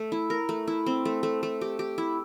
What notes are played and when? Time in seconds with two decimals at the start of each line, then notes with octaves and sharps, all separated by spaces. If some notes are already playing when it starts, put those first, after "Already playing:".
Already playing: A3
0.12 E4
0.30 A#4
0.49 A3
0.68 E4
0.86 C4
1.05 A3
1.23 A3
1.43 A3
1.61 G4
1.79 G4
1.98 E4